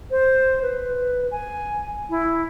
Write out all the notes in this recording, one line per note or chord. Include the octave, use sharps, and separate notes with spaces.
C5
B4
G#5
E4